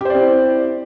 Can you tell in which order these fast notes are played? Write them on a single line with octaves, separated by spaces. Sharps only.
G4 C5 D5 C4 E4